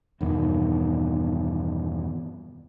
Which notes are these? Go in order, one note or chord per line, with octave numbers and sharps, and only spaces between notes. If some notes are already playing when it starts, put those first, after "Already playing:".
E2 G2 B2 D#3